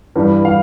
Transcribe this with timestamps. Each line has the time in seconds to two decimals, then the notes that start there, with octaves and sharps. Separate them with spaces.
0.16 G2 E3 G3
0.45 E3 G3 F5